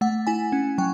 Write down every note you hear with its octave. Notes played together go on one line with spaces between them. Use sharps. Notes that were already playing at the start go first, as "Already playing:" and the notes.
A3 F#5
E4 G#5
C#4
F#3 G5